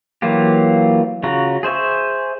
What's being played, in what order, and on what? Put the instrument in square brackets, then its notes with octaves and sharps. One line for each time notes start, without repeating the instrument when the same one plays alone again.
[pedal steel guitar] E3 F#3 A#3 F4 G4
C#3 F4 F#4 A#5
G#4 C5 E5 C#6